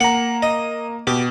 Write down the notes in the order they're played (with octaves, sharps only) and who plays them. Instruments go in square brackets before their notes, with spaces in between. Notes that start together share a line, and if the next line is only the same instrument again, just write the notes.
[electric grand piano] A#3 A#5 [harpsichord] F#5
[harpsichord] D#5
[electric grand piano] B2 [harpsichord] G4